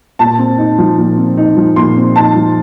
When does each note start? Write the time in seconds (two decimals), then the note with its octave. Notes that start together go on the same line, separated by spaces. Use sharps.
0.19 A#2 A5
0.39 C4
0.58 D#4
0.79 F3
0.98 A#2
1.18 C4
1.37 D#4
1.57 F3
1.76 A#2 C6
1.97 C4
2.16 D#4 A5
2.35 F3